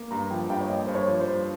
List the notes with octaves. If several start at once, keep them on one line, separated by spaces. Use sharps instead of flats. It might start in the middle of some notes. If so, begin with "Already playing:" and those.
Already playing: A#3
G2 A#5
F3 G5
G2 G5
C#5
A#3 D#5
G2 C5
C#5
F3
C5
G2